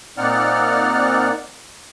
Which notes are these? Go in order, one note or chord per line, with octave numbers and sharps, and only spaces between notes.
A#2 C4 D#4 D5 F#5 F6